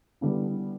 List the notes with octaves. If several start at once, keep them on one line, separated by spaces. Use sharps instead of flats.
D3 G3 B3 E4